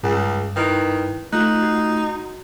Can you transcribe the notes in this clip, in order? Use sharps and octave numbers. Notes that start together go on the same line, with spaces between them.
C#2 G2
D#3 E4 B4 G5
A3 D#4 F4 F#6
F#4